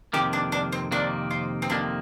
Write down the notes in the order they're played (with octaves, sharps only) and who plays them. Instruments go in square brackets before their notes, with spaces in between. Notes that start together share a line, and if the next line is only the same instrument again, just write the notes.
[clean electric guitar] F2 C3 D#3 A#3 [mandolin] G4
[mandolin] D4
D4
C4
[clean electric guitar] F2 C3 D#3 A#3 [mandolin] D4
[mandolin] F4
C4
[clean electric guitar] F2 C3 D#3 A#3 [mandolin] D4